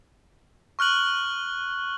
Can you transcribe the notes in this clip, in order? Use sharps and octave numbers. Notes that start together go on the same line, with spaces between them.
C#6 F6 F#6 F#7 G7